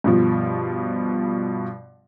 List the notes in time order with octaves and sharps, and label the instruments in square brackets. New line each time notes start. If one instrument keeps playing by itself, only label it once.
[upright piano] G2 B2 F3